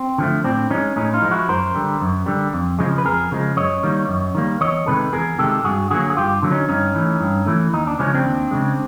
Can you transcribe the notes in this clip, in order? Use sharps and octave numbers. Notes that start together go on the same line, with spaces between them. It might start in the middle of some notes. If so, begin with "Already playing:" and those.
Already playing: C4
D3 F3 A3
A2 C4 D4
F3 G#3 C#4 D#4
A2 C#4 D#4
D#4 F4
F3 G#3
E4 F#4
F#2 A#4 C5
D3 G3
F#2
D3 G3
F2
C#3 F3 G#3
B4
F2 G#4 A#4
C#3 F3 G#3
F#2 C#5 D#5
D#3 G3 A#3
F#2
D#3 G3 A#3
E2 C#5 D#5
C3 D#3 G#3 A4 B4
E2 G#4 A#4
C3 D#3 G#3 G4 A4
G2 F#4 G#4
D3 F#3 A#3 F#4 G#4
G#4
G2 F4 G4
D3 F#3 A#3
C#4 D#4
G2 C#4 D#4
E3 A3
G2
E3 A3
D#2 D#4
D4
C#3 F3 G#3 C#4
C4 D4
D#2
C#3 F3 G#3